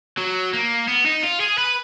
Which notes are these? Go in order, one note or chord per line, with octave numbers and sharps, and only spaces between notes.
F#3
A#3
B3
D#4
F4
G#4
B4